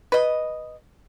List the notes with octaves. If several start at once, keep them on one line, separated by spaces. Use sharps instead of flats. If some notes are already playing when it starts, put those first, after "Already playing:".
B4 D#5